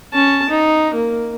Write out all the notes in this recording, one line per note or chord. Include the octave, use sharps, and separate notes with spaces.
C#4 A5
D#4
A#3